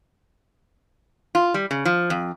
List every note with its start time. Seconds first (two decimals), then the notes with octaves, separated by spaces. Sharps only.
1.35 F4
1.54 G3
1.71 C#3
1.85 F3
2.10 F2